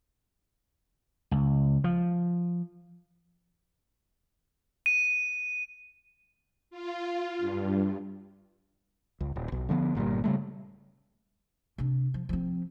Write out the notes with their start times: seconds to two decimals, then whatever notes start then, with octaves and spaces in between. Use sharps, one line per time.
1.31 C#2
1.84 F3
4.86 D#7
6.71 F4
7.38 G2
9.21 C#2
9.36 D#1
9.52 B1
9.69 D3 F3 G#3 B3
9.95 G1 A#2 C#3 G3
10.24 C#3 G3 A3
11.78 C3 D4
12.14 F3
12.29 F3 C4